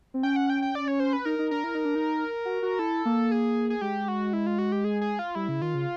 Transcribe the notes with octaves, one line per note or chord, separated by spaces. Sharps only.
C4
C#4 G5
F#5
G5
G5
D5
C#5
C5
B4
D#4 A#4
D#4
D4 A#4
E4
D#4
D4
D#4
F#4
F#4
E4 A4
A#3
G#4
G#4
G#3 G4
F#4
E4
F4
F#4
G4
G#4
G#4
F4
G3 E4
C#3
D#3 F4
C#3